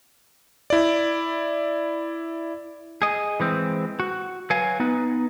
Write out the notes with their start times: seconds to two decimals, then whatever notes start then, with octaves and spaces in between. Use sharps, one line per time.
0.70 E4 D5
3.02 G#4 D#5
3.40 E3 G#3 C4
4.00 F#4
4.50 F#3 B4 F5 G#5
4.80 B3 D#4 B4